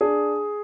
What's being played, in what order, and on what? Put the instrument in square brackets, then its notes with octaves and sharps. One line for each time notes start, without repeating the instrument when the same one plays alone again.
[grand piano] D4 G#4